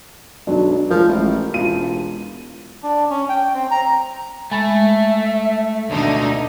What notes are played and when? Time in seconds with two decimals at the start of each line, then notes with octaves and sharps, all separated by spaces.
0.47 B1 F#3 D4
0.90 F3 G#3 A#4
1.08 A1
1.54 E1 F4 D#7
2.83 D4
3.10 C#4
3.29 G5
3.54 C4
3.71 A#5
4.52 G#3 A3 E5 B5 A6
5.90 D2 B2 D3 D#4